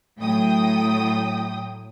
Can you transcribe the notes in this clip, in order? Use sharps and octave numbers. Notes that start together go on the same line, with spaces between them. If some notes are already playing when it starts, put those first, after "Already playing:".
A2 F#3 G5 D#6